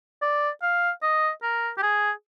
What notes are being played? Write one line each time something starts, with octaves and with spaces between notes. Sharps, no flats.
D5
F5
D#5
A#4
G4
G#4